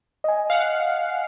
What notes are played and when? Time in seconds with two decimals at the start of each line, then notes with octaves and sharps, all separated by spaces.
0.24 D#5 G#5
0.50 F5 F#5